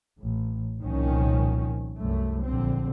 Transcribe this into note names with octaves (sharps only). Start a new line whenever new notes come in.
A1
C2 A#2 D#3 F3 C#4
C2 F#2 A3
A#1 D3 C4